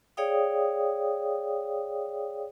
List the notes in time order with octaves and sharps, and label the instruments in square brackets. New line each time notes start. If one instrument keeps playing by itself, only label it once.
[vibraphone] G#4 C#5 D5 F5 G5 D#6